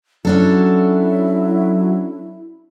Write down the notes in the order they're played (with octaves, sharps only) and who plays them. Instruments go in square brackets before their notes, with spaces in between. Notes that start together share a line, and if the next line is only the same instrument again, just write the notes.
[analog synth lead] F#3 [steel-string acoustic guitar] C#4 D4 A4 [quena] E4